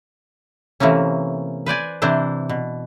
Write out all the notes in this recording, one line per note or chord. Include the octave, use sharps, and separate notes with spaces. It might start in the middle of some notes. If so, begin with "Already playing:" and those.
C3 E3 A3 A#3 C#4
B4 C5 D5 G#5
C3 E3 D4 E4 C5
B2